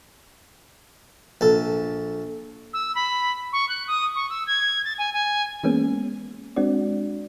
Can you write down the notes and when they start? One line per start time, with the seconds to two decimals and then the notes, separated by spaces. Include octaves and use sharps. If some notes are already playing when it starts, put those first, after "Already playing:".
1.41 A#1 A4
2.73 E6
2.95 B5
3.53 C#6
3.69 F#6
3.87 D#6
4.15 C#6
4.30 E6
4.47 G#6
4.85 A6
4.98 G#5
5.13 G#5
5.64 E3 G#3 A#3 B3 C#4 G#4
6.56 G#3 C4 D4 F#4 D5